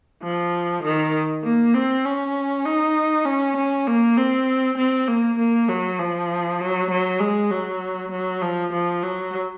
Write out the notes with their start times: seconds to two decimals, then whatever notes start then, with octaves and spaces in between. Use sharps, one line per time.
0.22 F3
0.83 D#3
1.43 A#3
1.74 C4
2.05 C#4
2.65 D#4
3.25 C#4
3.57 C#4
3.87 A#3
4.17 C4
4.78 C4
5.08 A#3
5.38 A#3
5.68 F#3
5.99 F3
6.60 F#3
6.90 F#3
7.20 G#3
7.50 F#3
8.11 F#3
8.42 F3
8.73 F3
9.03 F#3